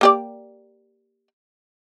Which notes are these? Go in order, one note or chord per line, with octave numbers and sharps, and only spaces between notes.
A#3 G4 D5